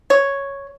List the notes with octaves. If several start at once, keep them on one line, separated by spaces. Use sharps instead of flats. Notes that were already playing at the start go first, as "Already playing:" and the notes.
C#5